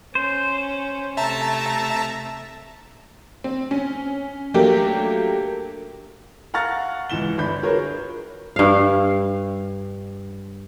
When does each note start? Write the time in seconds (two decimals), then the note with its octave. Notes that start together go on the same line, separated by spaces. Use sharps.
0.15 C#4 C5
1.17 C3 A3 E5 A5 A#5
3.44 C4
3.71 C#4
4.54 F#3 A3 A#3 D4 G4
6.54 F5 F#5 A#5 C#6 F6 A6
7.10 C#2 E3 E7 G7
7.38 G1 D4 B5 G6
7.62 F4 F#4 G#4 A#4 B4 C#5
8.56 G2 F5